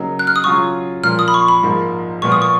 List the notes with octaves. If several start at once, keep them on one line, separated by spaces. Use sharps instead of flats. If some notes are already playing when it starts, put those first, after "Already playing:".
Already playing: C#3 F#3 A#3 D#4
F#6
F6
D#6
C#3 F#3 C#4 F4 C#6
A#2 F3 A#3 F6
D#6
B5
C#6
B5
G#2 F3 A#3
A#2 F3 B3 F4 C#6
D#6
C#6